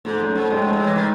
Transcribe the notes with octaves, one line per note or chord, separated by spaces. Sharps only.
G#2 A3
F#2
A3
G#2
A2 G#3
G#2
A2
E3
D#3